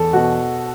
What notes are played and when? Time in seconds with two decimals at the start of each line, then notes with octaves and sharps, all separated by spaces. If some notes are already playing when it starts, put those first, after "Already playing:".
Already playing: E2 A4
0.13 B2 F#4